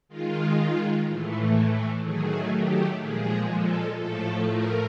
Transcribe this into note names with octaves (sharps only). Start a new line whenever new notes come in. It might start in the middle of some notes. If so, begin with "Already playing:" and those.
D#3 G#3 F4
A2 E3 A3
D#3 F#3 A3 G#4
G4
A#2 F3 G#3 G#4
A4
A2 F3 A3 A4
A#4